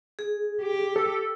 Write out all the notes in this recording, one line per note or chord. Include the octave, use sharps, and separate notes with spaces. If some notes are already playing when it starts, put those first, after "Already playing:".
G#4
G4
A4